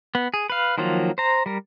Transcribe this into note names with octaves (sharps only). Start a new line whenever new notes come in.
B3
G#4
B4 F5
D#3 F3 F#3 A#3 F4
C5 A#5
G3 A#4